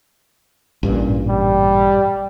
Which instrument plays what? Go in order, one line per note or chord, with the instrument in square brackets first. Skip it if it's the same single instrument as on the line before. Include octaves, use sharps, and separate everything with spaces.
[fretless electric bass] A1 G2 A#2
[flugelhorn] G3